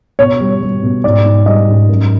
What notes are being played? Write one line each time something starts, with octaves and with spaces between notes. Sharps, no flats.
B2 C#5
G3
G3
B2
G#2 D5
G#2
G3 D#5
G#2
F#2